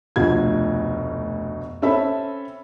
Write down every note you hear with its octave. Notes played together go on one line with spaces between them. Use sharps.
F1 D2 B2 F4 G#6
C4 C#4 A4 E5 B5